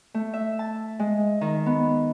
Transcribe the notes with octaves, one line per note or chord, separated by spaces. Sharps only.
A3
E5
A5
G#3
D#3
B3